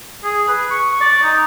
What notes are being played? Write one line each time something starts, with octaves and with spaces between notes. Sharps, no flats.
G#4
B4
C#6
D5
D#4